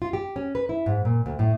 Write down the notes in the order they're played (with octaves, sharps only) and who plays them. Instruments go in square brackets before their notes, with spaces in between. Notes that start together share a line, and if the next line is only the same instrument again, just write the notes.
[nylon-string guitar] F4
G4
C#4
B4
E4
G#2
A#2
D2
A2